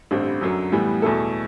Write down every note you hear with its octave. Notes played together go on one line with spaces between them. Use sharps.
A1 G2 D3 G3 C4
F#2 D3 F#3
A2 E3 G3 B3
E2 B2 A3 E4 A4